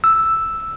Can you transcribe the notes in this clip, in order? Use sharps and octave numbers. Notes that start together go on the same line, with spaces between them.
E6